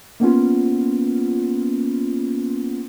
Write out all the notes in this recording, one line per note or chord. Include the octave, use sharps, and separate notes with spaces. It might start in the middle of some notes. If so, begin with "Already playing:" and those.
A#3 B3 C#4 F4